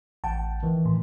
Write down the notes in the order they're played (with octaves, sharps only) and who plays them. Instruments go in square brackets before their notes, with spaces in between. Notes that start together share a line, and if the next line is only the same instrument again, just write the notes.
[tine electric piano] A1 F#5 G5 [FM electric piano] A5
[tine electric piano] D#3 E3
[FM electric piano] A2